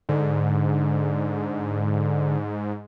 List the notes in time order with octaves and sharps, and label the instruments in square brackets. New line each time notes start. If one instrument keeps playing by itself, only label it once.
[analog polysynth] G#2 [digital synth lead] D3